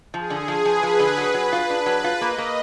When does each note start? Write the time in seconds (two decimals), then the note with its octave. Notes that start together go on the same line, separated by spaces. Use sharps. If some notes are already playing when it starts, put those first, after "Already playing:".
0.14 F3 G#4
0.30 D3
0.48 F3
0.65 F3 B4
0.83 F3
1.00 D3
1.17 F#3
1.34 F#3
1.53 F4
1.69 D4 B4
1.86 F#3
2.04 F4
2.21 A#3 D#5
2.38 A#3